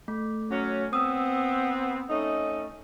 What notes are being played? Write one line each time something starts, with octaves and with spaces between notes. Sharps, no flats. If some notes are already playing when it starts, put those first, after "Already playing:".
A3
F#3 C#4
B3 C4 D#6 E6
A3 C#4 D#4